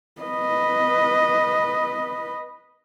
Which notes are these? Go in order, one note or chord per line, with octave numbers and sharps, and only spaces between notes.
B4 D#5